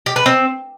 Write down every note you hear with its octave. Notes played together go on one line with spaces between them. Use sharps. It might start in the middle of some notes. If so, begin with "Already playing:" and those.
G4
B4
C4